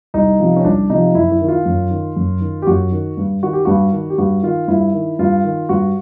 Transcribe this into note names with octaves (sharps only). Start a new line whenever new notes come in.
C2 D#4
C3 F3
C#4
C2 D4
C3 F3 D#4
F#2 E4
E4
D#3
F4
F#2
D#3
F#2
D#3
G4
F#2 F#4
D#3
G2
D#3 F#4
G4
G2 F#4
D#3
G4
G2 F#4
D#3 F4
G2 E4
D#3
G2 F4
D#3
G2 F#4